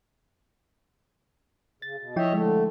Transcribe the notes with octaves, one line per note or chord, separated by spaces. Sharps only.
C#3 A6
B2
F3 E4 C#5 D#5 E5 G5
D3 G#3 A3